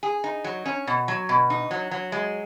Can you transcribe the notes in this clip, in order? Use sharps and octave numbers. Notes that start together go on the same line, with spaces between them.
G#4
D#4
F#3
C#4
B2
F#3
B2
D#4
F#3
F#3
G#3